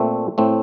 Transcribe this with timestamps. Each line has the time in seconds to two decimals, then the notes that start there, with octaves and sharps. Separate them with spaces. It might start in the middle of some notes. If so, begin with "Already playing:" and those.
Already playing: A#2 A3 C4
0.38 A2 A3 C4